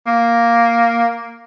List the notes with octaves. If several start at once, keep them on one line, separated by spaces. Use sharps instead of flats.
A#3